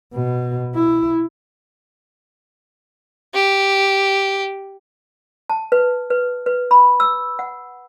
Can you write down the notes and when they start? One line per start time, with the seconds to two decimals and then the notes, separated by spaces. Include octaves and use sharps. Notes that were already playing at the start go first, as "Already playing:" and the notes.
0.15 B2
0.75 E4
3.34 G4
5.50 A5
5.72 B4
6.10 B4
6.46 B4
6.71 B5
7.00 E6
7.39 F#5